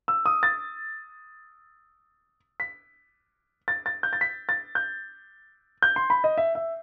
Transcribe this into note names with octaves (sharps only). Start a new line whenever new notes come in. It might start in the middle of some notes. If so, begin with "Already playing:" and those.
E6
D#6
A6
B6
A6
A6
G6
A6
B6
A6
G6
G6
C6
B5
D#5
E5
E5